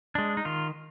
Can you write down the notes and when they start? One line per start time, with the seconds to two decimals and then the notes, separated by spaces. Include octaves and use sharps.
0.15 G#3 D4
0.37 D#4
0.45 D#3 F4